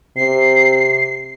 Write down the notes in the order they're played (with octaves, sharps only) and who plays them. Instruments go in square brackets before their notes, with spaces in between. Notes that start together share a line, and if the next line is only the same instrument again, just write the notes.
[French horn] C3 [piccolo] C7